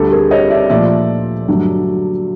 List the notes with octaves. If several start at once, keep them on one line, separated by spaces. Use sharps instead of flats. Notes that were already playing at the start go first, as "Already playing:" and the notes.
Already playing: D2 D3 G3 G4 A4
G#4 A#4
C#5 D#5
D5 E5
A#2 F3 A3 D5 E5
G2 D3 F#3 A3